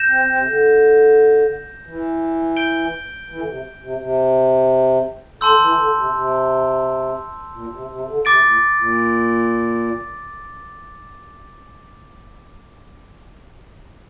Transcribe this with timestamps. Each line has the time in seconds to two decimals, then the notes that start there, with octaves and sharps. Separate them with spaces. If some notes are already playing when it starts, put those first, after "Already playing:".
Already playing: G6 A#6 E7
0.09 C4
0.27 C4
0.35 C3
0.45 D3
1.86 E3
2.57 G6 D7 G7
3.28 E3
3.38 D3
3.46 C3
3.81 C3
3.99 C3
5.40 D3 A5 C6 E6 G6
5.59 E3
5.76 D3
5.94 C3
6.11 C3
7.53 A#2
7.71 C3
7.89 C3
8.06 D3
8.24 C3 D6 A6 D7
8.42 A#2
8.78 A#2